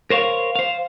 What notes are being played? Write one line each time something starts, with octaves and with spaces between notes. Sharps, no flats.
A#4 C5 C#5 F5
C5 F5